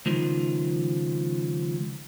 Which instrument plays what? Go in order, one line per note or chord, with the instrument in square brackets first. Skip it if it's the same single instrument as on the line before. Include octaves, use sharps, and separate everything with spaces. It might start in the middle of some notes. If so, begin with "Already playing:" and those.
[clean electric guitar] C#2 D#3 F3